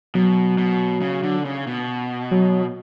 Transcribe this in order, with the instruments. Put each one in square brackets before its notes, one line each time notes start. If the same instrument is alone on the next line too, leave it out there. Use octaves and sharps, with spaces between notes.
[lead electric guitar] B2 [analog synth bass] F#3
[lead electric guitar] B2
C#3
D3
C#3
B2
[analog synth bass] F#3